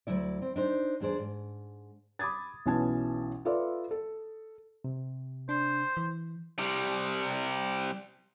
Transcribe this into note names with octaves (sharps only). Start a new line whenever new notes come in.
D2 F#3 E4 D5
C4
D4 D#4 C5
E2 D4 G#4 C5 D5
G#2
B5 D6 D#6 G#6 A6
B1 E3 C#4 A5 G#6
F4 A4 B4 D5 E5
A4
C3
D4 C5
E3
C3 G3